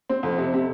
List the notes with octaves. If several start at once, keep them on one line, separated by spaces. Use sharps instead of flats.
C4
F2
C3
C3